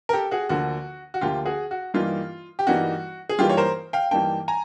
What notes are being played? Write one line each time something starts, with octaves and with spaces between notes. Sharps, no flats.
A#4
G4 A4
F#4 G#4
D2 D3 F3 A#3 F#4
F#4
D2 D3 F3 A#3 F4 G4
F#4 G#4
F#4
G2 E3 G3 A#3 D#4 F4
G4
G2 E3 G3 A#3 D#4 F#4
G#4
G2 E3 G3 A#3 D#4 F4 G4
C#5
A#4 C5
F5 G5
G2 E3 G3 A#3 D#4 G5 A5
G#5 A#5